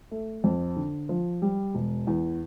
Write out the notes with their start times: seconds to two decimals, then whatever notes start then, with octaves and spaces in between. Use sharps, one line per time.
0.11 A3
0.44 F2
0.76 D3
1.09 F3
1.42 G3
1.75 E1
2.07 E2